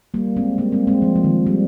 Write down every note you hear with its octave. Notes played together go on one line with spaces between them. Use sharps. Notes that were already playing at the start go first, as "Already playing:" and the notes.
G3 A#3
G#3 C4
G3 A#3
G#3 C4
G#3 C4
F3
F3
D#3
G3